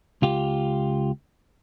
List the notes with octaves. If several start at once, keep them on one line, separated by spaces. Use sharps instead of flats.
C#2 F4 G4